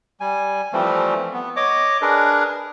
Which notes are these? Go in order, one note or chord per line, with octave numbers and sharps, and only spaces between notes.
G3 G#5
E3 F3 G3 A3 C4
B3
C#5 D#5 D6
D4 G#4 A#4 B4